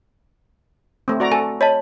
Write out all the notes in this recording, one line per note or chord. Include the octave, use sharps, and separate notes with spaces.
A3 C4
F#4 D5 A#5
A4 G#5
C#5 D#5 A5 B5